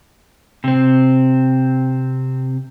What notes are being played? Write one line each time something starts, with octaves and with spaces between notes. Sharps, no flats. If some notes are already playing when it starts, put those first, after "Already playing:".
C3 C4